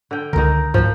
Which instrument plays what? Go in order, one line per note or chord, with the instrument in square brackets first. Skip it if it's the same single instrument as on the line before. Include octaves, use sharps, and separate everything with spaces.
[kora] D3 G5
[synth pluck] C#2 D3 [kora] D#3 A#4
[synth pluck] D2 G#2 [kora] F3